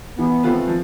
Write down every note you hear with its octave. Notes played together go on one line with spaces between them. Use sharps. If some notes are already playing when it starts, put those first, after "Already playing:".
E3 B3
A3 C4 F4 B4
F3